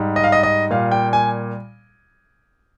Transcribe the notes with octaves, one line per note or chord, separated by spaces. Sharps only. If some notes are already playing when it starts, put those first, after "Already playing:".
Already playing: G#2 G3
D#5
F5
D#5
D#5
A#2 G3 F5
G5
G#5